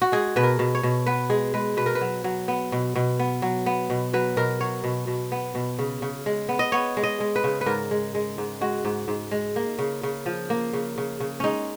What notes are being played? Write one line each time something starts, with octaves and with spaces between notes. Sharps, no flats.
F#4
G#3 G#4
B2 B4
A#4
B2
C#5
B2
B3 B4
G#3 G#4
G#3 B4
B2 B4
A#4
B4
F#3
F#3
B3
B2
B2
B3
F#3
B3
B2
F#3 B4
B2 A#4
F#3 C#5
B2
B2
B3
B2
C#3
C#3
G#3
B3
D#5
B3 C#5
G#3
D#5
G#3
B4
C#3
B4
G#2 A#4
G#3
G#3
G#2
G#3 F#4
G#2
G#2
G#3
A#3
C#3
C#3
F3
A#3
C#3
C#3
C#3
G#3 C#4 D#4